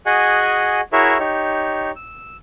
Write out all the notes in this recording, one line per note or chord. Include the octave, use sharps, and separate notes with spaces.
F#4 G#4 D#5 F#5 G#5
E4 F#4 G#4 A#4 C#5 E5
D#4 G4 C#5
E6